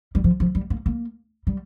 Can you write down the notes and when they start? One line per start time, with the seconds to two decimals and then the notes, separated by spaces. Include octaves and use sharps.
0.15 G3
0.24 F3
0.40 F3
0.55 G3
0.70 A#3
0.86 A#3
1.47 G3